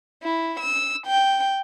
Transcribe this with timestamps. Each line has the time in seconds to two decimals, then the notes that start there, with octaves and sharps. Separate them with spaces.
0.23 E4
0.60 E6
1.07 G5